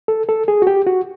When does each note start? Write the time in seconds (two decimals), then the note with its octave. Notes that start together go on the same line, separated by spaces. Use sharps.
0.08 A4
0.29 A4
0.48 G#4
0.62 F#4
0.67 G4
0.86 F#4